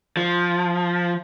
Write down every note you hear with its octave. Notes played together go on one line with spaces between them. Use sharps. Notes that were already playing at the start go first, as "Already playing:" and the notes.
F3